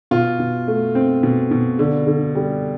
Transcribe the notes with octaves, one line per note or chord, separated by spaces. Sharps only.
B2 F4
B2
A3
C4
B2
B2
D3
D3
G3